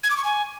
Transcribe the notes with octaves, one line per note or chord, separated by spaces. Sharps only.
G#6
D6
C#6
G#5